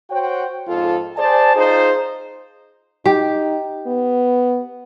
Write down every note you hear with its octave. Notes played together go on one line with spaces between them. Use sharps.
F#4 C5 C#5 F#5 G5
F2 G#2 F4 A4
G#4 C5 D5 G#5 A5
D#4 F4 G#4 C5
D#4 G4
B3